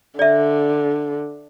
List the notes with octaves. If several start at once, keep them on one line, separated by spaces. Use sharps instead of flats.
D3 D5 E5